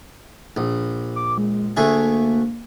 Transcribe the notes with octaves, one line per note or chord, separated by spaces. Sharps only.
A#1
D6
G#3
D2 A3 A#3 G#4